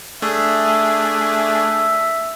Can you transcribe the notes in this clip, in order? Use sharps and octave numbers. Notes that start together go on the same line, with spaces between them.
A3 D4 G#4 E5